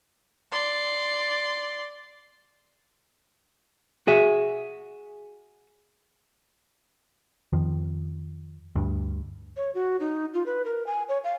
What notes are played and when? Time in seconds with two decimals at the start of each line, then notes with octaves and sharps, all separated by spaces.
0.52 D5 C6
4.07 F#4 G#4 E5
7.53 F2 D#3 F3
8.75 D2 G2
9.57 C#5
9.75 F#4
10.00 D#4
10.34 F4
10.46 B4
10.65 A#4
10.86 G#5
11.09 C#5
11.24 F5